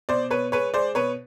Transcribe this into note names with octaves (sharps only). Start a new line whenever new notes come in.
B2 C5 D5
B2 B4 C#5
G#3 B4 C#5
G#3 C5 D5
B2 B4 C#5